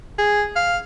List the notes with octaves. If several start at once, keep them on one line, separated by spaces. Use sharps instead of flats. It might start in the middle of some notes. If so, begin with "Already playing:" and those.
G#4
F5